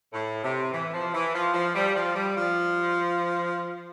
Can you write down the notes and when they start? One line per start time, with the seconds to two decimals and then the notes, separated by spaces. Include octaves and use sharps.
0.13 A2
0.43 C3
0.73 E3
0.94 F3
1.14 E3
1.34 F3
1.54 F3
1.75 G3
1.95 F3
2.15 G3
2.35 F3